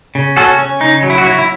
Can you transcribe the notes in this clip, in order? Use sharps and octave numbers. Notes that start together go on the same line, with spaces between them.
C#3
C#4 F#4 A4
C#4
C#3 D#4
F#3
E4
F#4
F#3 E4
E4